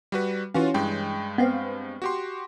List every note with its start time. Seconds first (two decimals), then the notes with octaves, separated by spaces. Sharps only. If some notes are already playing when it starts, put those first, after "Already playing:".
0.12 G3 F#4 B4
0.54 E3 C#4 F4 F#4 F5
0.74 G2 G#3 G5
1.38 B3 C4 F5
2.02 F#4 G4 C6